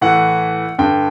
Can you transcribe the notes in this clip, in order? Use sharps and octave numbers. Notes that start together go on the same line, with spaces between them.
A2 E3 F#5
G2 D3 G5